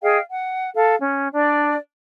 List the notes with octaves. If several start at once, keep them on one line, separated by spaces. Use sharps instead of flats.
G#4 D#5 F5 G5
F#5
A4 F5
C#4
D4 D5